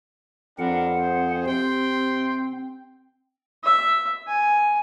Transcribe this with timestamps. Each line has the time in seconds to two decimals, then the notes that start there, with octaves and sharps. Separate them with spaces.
0.59 F2 C4 D4 A#4 B4 F#5
0.99 G#4 C5
1.47 C3 C4 G5 C6
3.64 E5
4.28 G#5